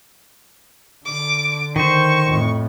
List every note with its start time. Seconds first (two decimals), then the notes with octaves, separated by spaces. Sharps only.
1.06 D3 D6
1.76 D#3 C5 C#6
2.26 F2 A2